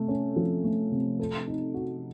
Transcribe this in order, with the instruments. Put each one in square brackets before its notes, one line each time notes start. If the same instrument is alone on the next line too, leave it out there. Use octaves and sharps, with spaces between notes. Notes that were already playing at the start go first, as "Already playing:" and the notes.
Already playing: [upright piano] C3 A3
C#4
F3
A3
C3
A4
D#4
F#4